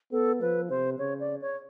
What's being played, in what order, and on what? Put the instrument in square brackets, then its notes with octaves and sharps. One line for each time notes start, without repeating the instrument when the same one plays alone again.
[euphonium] B3 [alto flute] A4
[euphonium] F3 [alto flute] B4
[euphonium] C3 [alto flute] C5
[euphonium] C#3 [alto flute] C#5
[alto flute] D5
C#5